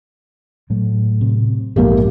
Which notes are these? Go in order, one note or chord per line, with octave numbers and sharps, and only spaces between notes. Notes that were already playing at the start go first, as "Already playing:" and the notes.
A2 F#3 A3
C3
A#1 F2 G#2 A3 A#3 G4